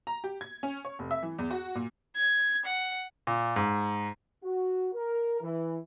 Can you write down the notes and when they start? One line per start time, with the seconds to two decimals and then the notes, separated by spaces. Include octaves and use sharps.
0.07 A#5
0.24 G4
0.41 G#6
0.63 C#4
0.85 C#5
0.99 F1
1.11 E5
1.23 E3
1.39 E2
1.50 F#4
1.75 A#2
2.14 G#6
2.64 F#5
3.27 A#2
3.56 G#2
4.43 F#4
4.94 A#4
5.41 E3